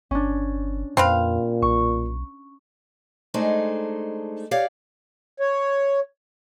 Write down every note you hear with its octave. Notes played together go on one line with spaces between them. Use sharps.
G1 C#4 D4
F2 A#2 C4 B4 F5
B1 C#6
G#3 A3 D4 D#4 G#4 C5
G4 C#5 D5 F5
C#5